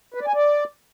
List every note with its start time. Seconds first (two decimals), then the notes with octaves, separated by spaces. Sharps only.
0.14 B4
0.21 D5
0.28 G#5
0.34 D5